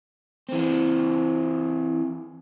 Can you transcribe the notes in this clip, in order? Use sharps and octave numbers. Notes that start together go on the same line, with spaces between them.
E3 C4